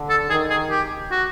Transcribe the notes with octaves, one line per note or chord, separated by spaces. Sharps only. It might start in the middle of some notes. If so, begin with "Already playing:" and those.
Already playing: D3
A4
D#3 G#4
G#4
G4
F#4